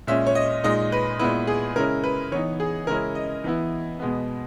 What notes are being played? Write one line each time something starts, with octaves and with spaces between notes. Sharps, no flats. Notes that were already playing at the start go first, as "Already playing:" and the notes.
A#2 G#3 C#4 E5
C#5
D#5
A#2 G#3 D#4 D#5
B4
A#2 G#3 B3 E4 B4
G#4
C#3 G#3 C#4 E4 A#4
B4
E3 B3 D#4 C#5
G#4
C#3 G#3 C#4 E4 A#4
D#5
E3 B3 E4
B2 G#3 B3